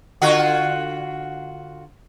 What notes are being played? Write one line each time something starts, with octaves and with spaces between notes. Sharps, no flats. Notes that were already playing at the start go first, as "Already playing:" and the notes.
D3 F4 F#4